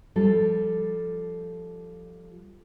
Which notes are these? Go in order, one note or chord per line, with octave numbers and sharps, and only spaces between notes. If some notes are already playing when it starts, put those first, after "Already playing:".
F3 G3 A4